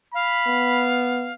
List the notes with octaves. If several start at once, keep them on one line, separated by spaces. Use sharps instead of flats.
F5 B5
B3